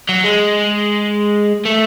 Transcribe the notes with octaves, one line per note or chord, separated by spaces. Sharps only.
F#3
G#3
A3